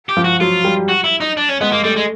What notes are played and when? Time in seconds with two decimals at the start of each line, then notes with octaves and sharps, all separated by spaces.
0.09 G4
0.17 F3
0.24 F#4
0.40 F#3 F4
0.64 G3
0.89 F#4
1.04 E4
1.20 D#4
1.37 D4
1.49 C#4
1.61 G#3 B3
1.72 A#3
1.84 G3 A3
1.96 G#3